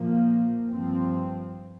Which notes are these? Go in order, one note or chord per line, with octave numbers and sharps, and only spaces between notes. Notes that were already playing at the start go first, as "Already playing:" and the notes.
Already playing: A#2 F3 A#3
G2 F3 C4